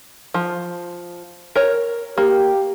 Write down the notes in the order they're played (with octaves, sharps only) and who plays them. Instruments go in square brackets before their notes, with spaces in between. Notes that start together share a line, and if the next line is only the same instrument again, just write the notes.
[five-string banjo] F3
A#4 C#5
[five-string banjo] A#3 [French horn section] G4